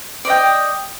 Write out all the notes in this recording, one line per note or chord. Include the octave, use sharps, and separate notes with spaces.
D5 D#5 G5